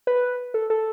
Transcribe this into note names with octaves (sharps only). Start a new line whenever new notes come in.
B4
A4
A4